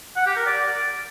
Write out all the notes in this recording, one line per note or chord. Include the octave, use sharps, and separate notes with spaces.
F#5
G4
A#4
D5